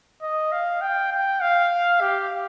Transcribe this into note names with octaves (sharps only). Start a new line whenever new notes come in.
D#5
F5
G5
G5
F5
G4